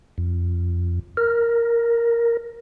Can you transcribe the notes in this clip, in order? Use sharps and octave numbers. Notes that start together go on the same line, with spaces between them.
F2
A#4